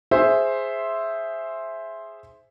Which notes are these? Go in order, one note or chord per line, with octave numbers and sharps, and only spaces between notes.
G#4 C5 E5 C6